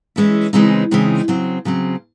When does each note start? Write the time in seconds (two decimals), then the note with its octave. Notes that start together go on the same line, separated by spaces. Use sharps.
0.16 E3 G#3 C#4 E4
0.53 C#3 E3 G#3 C4 D#4
0.91 C#3 E3 G#3 C4 D#4
1.28 C#3 F#3 C4
1.65 C#3 F#3 C4